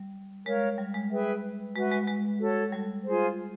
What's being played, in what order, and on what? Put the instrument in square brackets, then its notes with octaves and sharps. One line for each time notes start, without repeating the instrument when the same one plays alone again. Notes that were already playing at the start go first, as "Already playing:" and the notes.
Already playing: [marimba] G3
[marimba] G#3 [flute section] A#4 C#5 F5
[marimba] G3
G#3
[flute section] G#4 B4 E5 G5
[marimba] G#3 [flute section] F#4 B4 E5
[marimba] G#3
G#3
[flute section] F#4 A4 C#5
[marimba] G3
[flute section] F4 G#4 C5